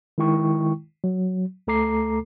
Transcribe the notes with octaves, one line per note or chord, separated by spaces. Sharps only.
D#3 G#3 E4 G5 C#6
F#3
D2 A3 A4 A#5 D6 C7